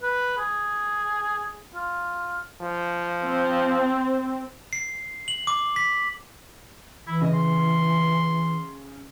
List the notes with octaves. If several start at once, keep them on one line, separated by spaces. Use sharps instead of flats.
B4
G#4
F4
F3
C4
C7
F#7
D6
B6
E3 E4
C#3 D#5
C6